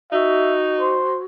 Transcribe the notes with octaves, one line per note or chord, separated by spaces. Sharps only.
D#4 F#4 E5
C5